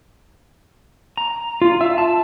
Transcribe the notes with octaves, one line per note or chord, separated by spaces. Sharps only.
A#5
F4
E5
A5